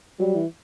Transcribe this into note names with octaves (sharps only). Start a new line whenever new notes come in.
F#3 G3
E3